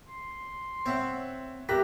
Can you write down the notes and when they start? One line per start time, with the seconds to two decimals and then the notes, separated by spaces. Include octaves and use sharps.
0.09 C6
0.86 C4 C#5 E5 F#5
1.69 G4 A#4 E5 F#6 B6